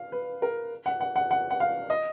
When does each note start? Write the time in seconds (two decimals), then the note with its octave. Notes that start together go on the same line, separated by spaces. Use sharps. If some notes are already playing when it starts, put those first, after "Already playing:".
Already playing: F5
0.12 B4
0.42 A#4
0.86 F#5
1.01 F#5
1.16 F#5
1.31 F#5
1.51 F#5
1.60 F5
1.90 D#5